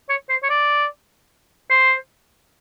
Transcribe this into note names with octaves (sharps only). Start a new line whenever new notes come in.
C#5
C5
C#5
D5
C5